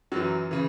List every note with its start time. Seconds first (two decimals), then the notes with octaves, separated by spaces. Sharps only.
0.12 F#2 E3 F#3
0.51 C#3 E3